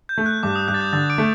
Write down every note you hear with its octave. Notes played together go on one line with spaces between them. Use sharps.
G6
A3
F#6
G2 D6
D#6
G2 F#6
A6
G6
D3 A6
D6 D7
A3